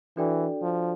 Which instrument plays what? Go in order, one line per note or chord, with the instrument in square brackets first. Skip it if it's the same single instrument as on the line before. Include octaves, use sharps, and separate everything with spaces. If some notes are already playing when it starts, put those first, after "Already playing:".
[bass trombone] E3 [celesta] D4 F#4 A4 D5 G5
[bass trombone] F3